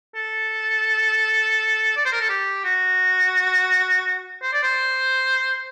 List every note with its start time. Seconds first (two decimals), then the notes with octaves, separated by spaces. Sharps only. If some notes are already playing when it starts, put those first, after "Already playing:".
0.15 A4
1.97 D5
2.05 C5
2.13 A#4
2.21 A4
2.30 G4
2.64 F#4
4.43 C5
4.53 D5
4.63 C5